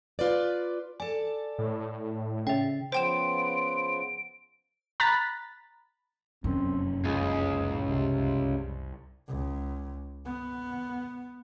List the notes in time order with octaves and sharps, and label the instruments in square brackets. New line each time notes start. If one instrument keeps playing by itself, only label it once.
[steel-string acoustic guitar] F4 B4 D5
[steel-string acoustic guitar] A4 D5 [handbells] G#5
[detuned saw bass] A2
[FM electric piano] C#3 [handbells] E5 G5
[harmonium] C#3 F3 B3 [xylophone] C5 G5 E7 [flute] C6 [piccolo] D7
[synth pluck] A#5 B5 F#6 A6 B6
[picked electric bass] F1 C#4 [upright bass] F#2 [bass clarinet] C4
[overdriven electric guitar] C#2 [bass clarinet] G#4
[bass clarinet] A2
[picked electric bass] C2 [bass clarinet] C3
[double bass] C#2
B3